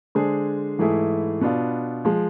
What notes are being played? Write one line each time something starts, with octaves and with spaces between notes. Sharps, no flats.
D3 G#3 D4 G#4 C5
G#2 E3 A3 E4 G#4
B2 B3 D4 F4
F3 G#3